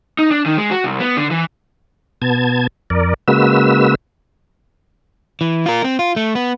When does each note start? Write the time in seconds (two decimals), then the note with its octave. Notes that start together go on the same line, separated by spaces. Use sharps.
0.19 D#4
0.31 D4
0.46 D#3
0.58 G#3
0.71 F#4
0.84 C2
1.00 B3
1.17 D3
1.31 E3
2.22 B2 B3 A5 G#6
2.90 F2 A#4 D5
3.28 C#3 G#3 A#3 F#4 B4 E6
5.41 E3
5.66 F4 A#4
5.84 C4
5.99 F4
6.16 A3
6.35 B3